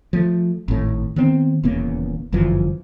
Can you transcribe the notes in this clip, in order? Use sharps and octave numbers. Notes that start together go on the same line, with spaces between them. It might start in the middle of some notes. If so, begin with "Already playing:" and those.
F3 A3
G#1 A2
D#3 B3 C4
D#1 E2 C#3 A#3
G1 F#2 E3 F3